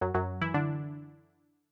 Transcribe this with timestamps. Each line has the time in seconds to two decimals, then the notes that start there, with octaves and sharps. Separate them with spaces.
0.01 F#2 F#3
0.15 F#2 F#3
0.41 E3 E4
0.54 D3 D4